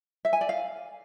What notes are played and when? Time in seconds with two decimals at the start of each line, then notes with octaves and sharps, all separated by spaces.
0.25 E5
0.33 G#5
0.41 D5
0.49 F5